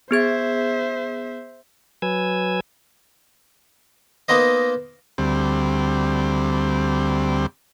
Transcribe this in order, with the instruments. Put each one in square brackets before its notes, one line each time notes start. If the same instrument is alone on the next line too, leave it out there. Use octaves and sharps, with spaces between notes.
[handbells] B3 G#4 G#6 [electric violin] C5 E5
[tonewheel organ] F#3 B4 G#5 E6 G#6
[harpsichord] A#3 B3 D#4 A#4 C5 D#5
[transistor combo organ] D2 G3 C4